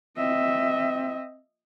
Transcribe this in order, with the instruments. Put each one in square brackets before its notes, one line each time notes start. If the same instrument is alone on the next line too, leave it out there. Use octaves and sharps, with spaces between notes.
[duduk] C4 [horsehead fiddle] D#5 E5